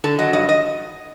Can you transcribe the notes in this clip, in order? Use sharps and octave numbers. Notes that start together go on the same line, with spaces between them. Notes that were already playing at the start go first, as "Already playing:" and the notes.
D3 A4
F#3 D#5
G2 D#5
D#5